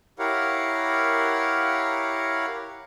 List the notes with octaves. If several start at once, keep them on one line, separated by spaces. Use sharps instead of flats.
E4 G4 A#4 C#5 F5 F#5